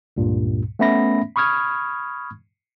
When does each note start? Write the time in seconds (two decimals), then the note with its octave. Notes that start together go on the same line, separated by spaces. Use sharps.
0.17 C#2 G2 A#2
0.79 A3 B3 C#4 E5 B5 A#6
1.36 B5 C#6 D#6 F6 G#6